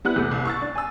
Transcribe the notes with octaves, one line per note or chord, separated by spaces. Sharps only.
G3 B3 E4 F#6
E2 C3 A3
C2
C#6 E6 A6
D4
G#5 E6